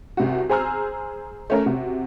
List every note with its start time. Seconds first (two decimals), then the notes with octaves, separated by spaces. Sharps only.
0.17 C2 C3 F#4
0.49 G#4 C5 G#5 A#5 E6 F6
1.50 A3 C#4 A#4
1.66 C3 F#4